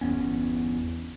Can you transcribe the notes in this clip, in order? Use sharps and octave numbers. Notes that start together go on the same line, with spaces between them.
G1 E2 B3 C#4